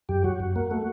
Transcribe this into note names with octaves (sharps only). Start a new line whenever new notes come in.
F#2 G4
F#3 F#4
F#2
A#3
A3